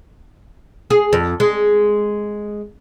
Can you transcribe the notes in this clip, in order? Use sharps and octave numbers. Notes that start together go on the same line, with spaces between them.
G#4
F2
G#3